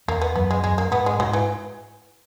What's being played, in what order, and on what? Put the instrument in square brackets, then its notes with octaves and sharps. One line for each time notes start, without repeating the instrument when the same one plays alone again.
[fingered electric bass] E2 [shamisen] A#3
[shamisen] B3
[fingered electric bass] F#2 [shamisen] B3
[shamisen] G#3
[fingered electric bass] F#2 [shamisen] G#3
[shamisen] A#3
[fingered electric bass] G#2 [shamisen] B3
[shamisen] G#3
[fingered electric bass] G#2 [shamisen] F#3
[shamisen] E3